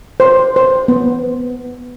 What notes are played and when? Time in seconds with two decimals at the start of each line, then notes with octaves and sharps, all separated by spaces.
0.20 C5
0.56 C5
0.88 B3